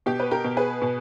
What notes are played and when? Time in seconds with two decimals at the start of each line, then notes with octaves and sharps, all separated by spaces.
0.06 B2 G4
0.20 B4
0.31 G4 A#4
0.44 B2
0.57 G#4 B4
0.82 B2